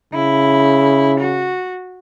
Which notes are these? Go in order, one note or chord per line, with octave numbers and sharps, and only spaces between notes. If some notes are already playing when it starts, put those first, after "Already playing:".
C#3 E4
F#4